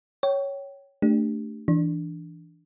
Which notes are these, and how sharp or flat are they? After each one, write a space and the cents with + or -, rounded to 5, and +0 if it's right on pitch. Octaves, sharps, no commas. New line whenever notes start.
C#5 +0 G5 -25
A3 +10 D4 +0 G4 +0
E3 +0 D4 +0